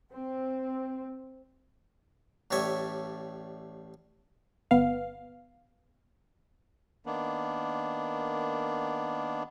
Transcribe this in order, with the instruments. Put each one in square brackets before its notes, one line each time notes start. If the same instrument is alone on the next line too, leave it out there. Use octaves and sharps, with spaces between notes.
[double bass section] C4
[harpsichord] A1 A2 G3 C#5 E5
[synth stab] G1 B3 F5
[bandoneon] D#3 A#3 B3 D4